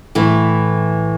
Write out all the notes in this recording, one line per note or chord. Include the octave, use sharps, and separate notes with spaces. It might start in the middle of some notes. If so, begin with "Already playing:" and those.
A2 E3 A3